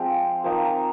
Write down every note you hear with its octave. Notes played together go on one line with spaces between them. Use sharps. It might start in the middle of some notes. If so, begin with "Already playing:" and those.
Already playing: F3 G#3 C4 F5 G5
F3 A#3 D#4 G5 A5
G#5 A#5